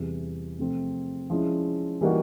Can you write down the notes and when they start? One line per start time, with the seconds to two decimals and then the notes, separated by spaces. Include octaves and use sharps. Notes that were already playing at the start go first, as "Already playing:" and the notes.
Already playing: E2 C3 E3 G3
0.58 C3 F3 A3 C4
1.30 F3 G#3 C#4 E4 G#4
2.01 E3 G3 A#3 D#4 F#4